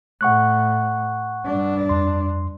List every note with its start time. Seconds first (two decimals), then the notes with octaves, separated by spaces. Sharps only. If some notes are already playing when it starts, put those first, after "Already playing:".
0.21 A2 F#5 C#6 F#6
1.45 G2 D4
1.89 F2 C6